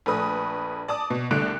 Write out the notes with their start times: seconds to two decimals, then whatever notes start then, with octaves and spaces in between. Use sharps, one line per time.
0.06 A#1 A3 B4 D#6
0.88 D5 A5 D6 D#6
1.10 B2
1.31 C2 D3 A3 F#6 C#7 D7